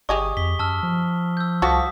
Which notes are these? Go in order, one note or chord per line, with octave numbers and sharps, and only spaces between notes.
G1 G4 G#4 D#5 C#6 D#6
F2 B6 G7
F#2 A5 E6 F6
F3
E6 G6
C2 F3 F#4 A4 D6 D#6 B6